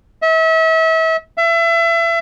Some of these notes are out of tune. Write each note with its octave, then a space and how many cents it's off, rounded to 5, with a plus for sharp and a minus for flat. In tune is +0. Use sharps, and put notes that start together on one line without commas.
E5 -35
E5 +30